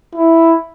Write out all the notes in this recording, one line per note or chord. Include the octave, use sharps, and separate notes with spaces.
E4